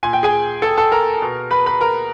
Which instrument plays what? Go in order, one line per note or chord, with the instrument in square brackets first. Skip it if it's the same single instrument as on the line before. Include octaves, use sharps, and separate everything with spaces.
[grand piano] A#2 G#5
G5
G#4 G#5
A4 A5
A4 A5
A#4 A#5
B2
B4 B5
B4 B5
A#4 A#5